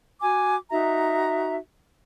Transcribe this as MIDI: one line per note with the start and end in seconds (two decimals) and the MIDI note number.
0.21 0.56 66
0.21 0.56 80
0.21 0.56 86
0.71 1.57 63
0.71 1.57 66
0.71 1.57 76
0.71 1.57 82